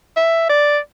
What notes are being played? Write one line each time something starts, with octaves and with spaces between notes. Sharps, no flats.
E5
D5